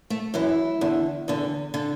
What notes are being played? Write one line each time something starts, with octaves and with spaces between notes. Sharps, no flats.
A3
F#2 E3 E4
E2 D3
E2 D3
D3